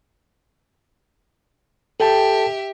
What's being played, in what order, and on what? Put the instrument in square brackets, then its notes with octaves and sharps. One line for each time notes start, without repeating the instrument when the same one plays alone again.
[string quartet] G4 E5 [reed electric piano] A4 G5 A5